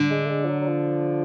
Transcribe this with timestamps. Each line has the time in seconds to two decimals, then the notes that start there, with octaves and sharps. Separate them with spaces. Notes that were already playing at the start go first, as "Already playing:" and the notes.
Already playing: D3
0.10 G#3
0.25 A3
0.29 G#3
0.44 F3
0.48 F#3
0.60 F#3
0.67 F3